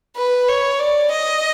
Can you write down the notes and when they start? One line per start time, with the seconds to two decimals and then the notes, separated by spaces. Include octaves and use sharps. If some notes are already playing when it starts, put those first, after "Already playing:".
0.16 B4
0.48 C#5
0.79 D5
1.10 D#5